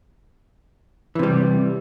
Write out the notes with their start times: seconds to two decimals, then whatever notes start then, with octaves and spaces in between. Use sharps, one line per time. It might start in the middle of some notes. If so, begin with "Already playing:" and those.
1.15 E3
1.19 C3
1.23 G3